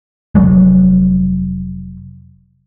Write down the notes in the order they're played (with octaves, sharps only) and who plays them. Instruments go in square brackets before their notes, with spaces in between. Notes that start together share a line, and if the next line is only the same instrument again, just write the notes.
[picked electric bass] F1 D#2 F#3 G#3